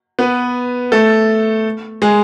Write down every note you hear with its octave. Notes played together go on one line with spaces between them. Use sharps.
B3 B4
A3 A4
G#3 G#4